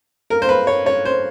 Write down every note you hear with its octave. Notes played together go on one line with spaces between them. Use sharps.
A#4
C5
B4
C#5
C#5
C5